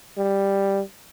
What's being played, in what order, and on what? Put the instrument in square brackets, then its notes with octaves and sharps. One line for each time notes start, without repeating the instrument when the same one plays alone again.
[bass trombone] G3